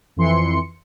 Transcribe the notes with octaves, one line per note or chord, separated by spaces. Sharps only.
F2 E3 C6 C#7